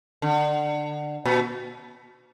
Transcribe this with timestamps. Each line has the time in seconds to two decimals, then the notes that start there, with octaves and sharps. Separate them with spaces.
0.22 D3
1.25 A#2